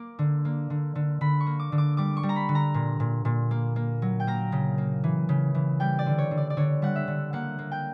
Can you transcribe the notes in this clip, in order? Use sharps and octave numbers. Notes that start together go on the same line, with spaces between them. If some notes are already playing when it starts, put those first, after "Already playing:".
Already playing: A#3 D6
D3
A#3
D3
D3
D3 B5
C#6
A#3
D6
D3
D6
G3 D6
C#6
G3
A#5
B5
D3
A#5
A#2
A#2
A#2
A#3
A#3
F#3
G5
A#3 A#5
C#3
A#3
E3
C#3
E3
G3 G5
D5
D3
C#5
D3
D5
D5
D3 C#5
G3 F#5
E5
D3
A#3 F#5
A#3
G5